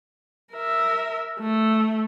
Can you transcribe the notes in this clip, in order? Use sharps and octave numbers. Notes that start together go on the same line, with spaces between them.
A#4 E5
A3